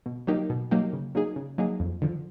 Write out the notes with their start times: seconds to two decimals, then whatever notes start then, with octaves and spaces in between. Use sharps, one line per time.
0.06 B2
0.27 F#3 A#3 D#4 G4
0.50 B2
0.71 F#3 A#3 D#4 G4
0.93 C#3
1.15 F#3 A#3 D#4 G#4
1.36 C#3
1.58 F#3 A#3 D#4 G#4
1.80 F2
2.02 D3 F3